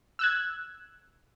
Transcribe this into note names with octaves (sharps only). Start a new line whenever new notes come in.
E6 F#6 G#6